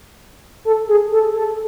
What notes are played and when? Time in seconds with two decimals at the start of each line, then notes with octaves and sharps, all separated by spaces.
0.65 A4
0.88 G#4
1.12 A4
1.36 A4